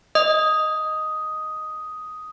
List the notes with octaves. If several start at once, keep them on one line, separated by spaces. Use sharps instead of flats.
D#5 D#6